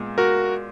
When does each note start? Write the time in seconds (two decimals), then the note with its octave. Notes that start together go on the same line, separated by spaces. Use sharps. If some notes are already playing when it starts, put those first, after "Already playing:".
Already playing: A#2 G#3 B3
0.18 F#4 A#4